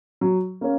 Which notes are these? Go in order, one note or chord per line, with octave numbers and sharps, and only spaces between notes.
F#3
A#3 C#4